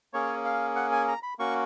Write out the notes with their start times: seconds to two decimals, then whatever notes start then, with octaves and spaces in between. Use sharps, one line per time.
0.13 A#3 C#4 G#4 C#5
0.45 F5
0.76 F#5
0.92 G#5
1.08 A#5
1.23 B5
1.39 A#3 C#4 F#4 C#6